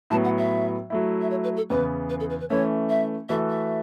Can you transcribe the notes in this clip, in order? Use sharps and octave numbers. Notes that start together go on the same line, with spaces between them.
A2 F#3 B3 A5
F#5
E5
F#3 A3 E4
E5
C#5
B4
A4
E2 C#3 E3 B3 B4
B4
A4
B4
B4
E3 A3 C#4 C#5
E5
E3 A3 F#4 A4 E5
E5